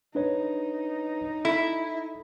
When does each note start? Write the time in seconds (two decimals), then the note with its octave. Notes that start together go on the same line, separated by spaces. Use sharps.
0.15 D4 D#4 B4 C#5
1.45 E4 A4